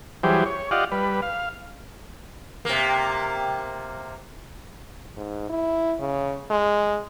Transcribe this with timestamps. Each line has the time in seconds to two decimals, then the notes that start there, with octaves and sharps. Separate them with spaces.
0.23 E3 F#3 G3 G4 G#4 C5
0.46 C#5
0.71 F4 G4 D5 D#5 F5 F#5
0.92 G3 B4
1.22 F5
2.65 C3 A#3
5.17 G#2
5.50 E4
6.00 C#3
6.51 G#3